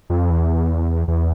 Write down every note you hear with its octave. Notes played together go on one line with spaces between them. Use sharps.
F2
E2
E2